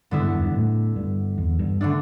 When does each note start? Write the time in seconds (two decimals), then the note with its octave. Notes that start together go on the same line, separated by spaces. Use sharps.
0.11 G2 D3 B3 E4
0.23 G2
0.33 E2
0.43 G2
0.54 A2
0.96 G2
1.38 E2
1.59 G2
1.81 D3 A3 D4